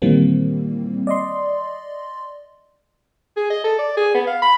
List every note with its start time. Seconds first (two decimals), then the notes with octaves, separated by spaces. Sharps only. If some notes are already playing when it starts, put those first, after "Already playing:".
0.02 A#2 D#3 E3 G3 A#3 C4
1.07 D5 D#5 C6
3.37 G#4
3.50 D#5
3.64 A4
3.79 D5
3.97 G#4
4.15 B3
4.27 F5
4.42 B5